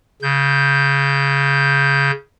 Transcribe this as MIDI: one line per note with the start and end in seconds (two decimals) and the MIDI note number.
0.22 2.11 49
0.22 2.11 91